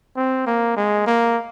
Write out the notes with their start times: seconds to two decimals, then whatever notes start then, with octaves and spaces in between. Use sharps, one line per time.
0.17 C4
0.47 A#3
0.77 G#3
1.07 A#3